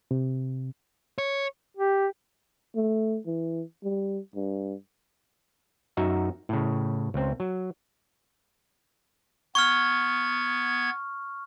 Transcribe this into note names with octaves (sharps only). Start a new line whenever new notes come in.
C3
C#5
G4
A3
E3
G3
G2
F#2 D#4 F#4 E5
A2 C#3
C#2 C4
F#3
B3 C#6 F6 G#6